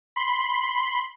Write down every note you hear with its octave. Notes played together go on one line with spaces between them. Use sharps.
B5 C6